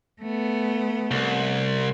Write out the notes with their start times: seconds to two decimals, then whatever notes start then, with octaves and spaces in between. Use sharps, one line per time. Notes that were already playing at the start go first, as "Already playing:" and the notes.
0.22 A3 B3
1.11 C2